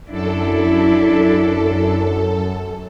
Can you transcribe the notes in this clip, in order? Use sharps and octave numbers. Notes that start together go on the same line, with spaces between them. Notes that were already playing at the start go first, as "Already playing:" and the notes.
F#2 D4 E4 A4